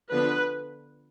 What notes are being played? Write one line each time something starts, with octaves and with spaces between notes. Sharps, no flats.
D3 F3 B3 D4 B4